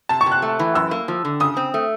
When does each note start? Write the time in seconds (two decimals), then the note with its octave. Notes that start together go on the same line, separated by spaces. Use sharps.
0.09 C3 A5
0.21 C#6
0.26 C3
0.32 F#6
0.42 A3
0.59 E3
0.75 F#2 E6
0.91 A#3
1.08 F3
1.25 D3
1.40 C#3 D#6
1.57 C4
1.74 A3